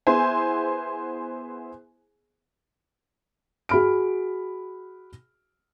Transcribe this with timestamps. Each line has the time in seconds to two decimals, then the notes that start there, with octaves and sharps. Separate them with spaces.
0.07 B3 E4 G#4 C5 G#5
3.69 F#4 G#4 B5 F6 D7